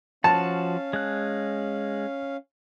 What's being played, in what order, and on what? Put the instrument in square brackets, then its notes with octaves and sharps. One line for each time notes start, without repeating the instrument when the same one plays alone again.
[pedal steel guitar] F3 F#4 [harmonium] C#4 F5 [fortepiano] A5
[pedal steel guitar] G#3 F#6